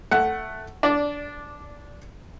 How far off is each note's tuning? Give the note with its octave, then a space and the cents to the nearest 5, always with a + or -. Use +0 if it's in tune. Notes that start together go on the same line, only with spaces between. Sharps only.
A3 +0 F#5 +15
D4 -15 D5 +0